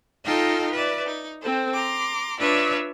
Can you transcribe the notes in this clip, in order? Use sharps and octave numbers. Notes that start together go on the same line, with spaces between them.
D#4 F4 A4 D#5 F5 G5
B4 D5 E5
D#4
C4 A4 C5
A#5 C6 D6
D4 F4 B4 C#5 D5 E5